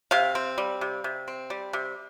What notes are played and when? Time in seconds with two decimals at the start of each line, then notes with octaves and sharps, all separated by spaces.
0.11 C3 F5
0.35 C4
0.58 G3
0.81 C3
1.04 C3
1.28 C4
1.50 G3
1.73 C3